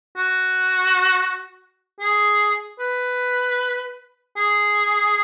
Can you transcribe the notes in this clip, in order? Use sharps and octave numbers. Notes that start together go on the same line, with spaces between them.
F#4
G#4
B4
G#4